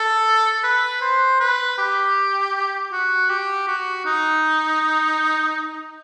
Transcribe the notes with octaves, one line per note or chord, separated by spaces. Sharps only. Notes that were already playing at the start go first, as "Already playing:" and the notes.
Already playing: A4
B4
C5
B4
G4
F#4
G4
F#4
D#4